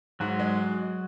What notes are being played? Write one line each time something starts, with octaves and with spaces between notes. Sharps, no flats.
G#2 F#3 F#4
G#3